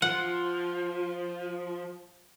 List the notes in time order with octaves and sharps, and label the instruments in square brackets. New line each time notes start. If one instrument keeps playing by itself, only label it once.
[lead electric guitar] F3 [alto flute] F4 [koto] F#5